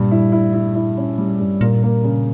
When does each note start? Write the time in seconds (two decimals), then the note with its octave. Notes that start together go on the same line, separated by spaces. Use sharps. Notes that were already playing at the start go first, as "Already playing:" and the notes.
Already playing: G2 A#2
0.11 E4
0.32 E4
0.54 E4
0.75 E4
0.98 C#4
1.18 G3
1.40 G2
1.61 A#2 A#3
1.83 A#3
2.04 C#3